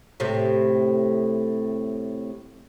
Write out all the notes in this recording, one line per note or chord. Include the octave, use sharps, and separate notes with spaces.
A2 C3